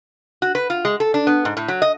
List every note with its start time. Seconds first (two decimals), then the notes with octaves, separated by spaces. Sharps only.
0.42 F#4
0.55 B4
0.70 F4
0.85 G#3
1.00 A4
1.14 D4
1.27 B3
1.45 G#2
1.57 A2
1.68 F#3
1.82 D#5